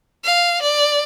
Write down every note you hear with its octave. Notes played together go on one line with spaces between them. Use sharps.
F5
D5